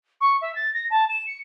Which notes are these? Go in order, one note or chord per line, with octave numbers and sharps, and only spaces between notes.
C#6
E5
A6
A#6
A5
E7
C#7